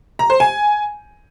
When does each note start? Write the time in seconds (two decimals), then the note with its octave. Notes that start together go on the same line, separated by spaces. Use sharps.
0.19 A#5
0.30 C5
0.40 G#5